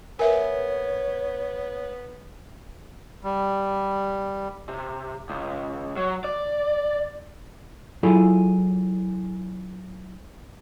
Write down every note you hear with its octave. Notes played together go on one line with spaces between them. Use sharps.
B3 A#4 B4 C#5 E5 G#5
G3
C3
C#2
F#3
D5
F#3 E4 F4 G#4 A4 B5